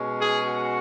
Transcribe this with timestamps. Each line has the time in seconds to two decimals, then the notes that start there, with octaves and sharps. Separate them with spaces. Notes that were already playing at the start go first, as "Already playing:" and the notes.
Already playing: B2 G#3 C#4
0.19 G#4
0.48 F#4